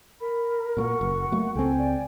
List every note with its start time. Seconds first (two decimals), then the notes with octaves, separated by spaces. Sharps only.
0.21 A#4 B5
0.77 A#2 A3 A#3 F#4 F#5 C#6
1.01 F#1
1.32 F#3 A3 A#3
1.55 C#2 C4 A4 G5 G#5
1.78 D5